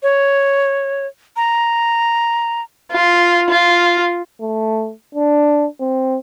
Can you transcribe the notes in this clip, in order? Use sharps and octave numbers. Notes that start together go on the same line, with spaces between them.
C#5
A#5
F4
F4
A3
D4
C4